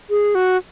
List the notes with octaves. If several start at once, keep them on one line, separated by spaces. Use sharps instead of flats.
G#4
F#4